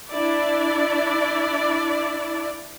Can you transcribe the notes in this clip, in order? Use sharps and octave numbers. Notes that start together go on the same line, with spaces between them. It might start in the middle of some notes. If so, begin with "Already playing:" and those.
D4 E4 D5